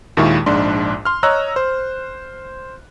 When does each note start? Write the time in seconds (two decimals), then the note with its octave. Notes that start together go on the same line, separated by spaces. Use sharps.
0.17 D#2 A#2 D#3 G#3 E4 C#6
0.46 A#1 G#2 D4 C6
1.05 C6 F6
1.23 C#5 D#5 A#5 E6 F#6
1.56 C5